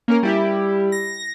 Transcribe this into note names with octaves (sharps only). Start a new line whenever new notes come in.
A#3 C#4 A#4
G3 E4 G4
A#6